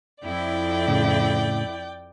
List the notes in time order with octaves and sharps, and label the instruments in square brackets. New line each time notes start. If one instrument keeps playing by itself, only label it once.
[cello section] F2 E4 [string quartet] D5 G5
[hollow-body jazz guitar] A2 C#3